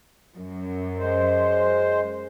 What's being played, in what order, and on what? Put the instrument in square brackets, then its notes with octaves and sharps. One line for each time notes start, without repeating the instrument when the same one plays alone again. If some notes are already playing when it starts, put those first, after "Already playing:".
[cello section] F#2
[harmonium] G#3 C5